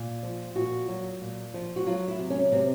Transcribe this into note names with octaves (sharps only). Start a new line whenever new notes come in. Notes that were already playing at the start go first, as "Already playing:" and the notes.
Already playing: A#2
F3
A#2 F#4
F#3
A#2
F3
F#4
F#3 F4
E4
C3
C#4
C3 C4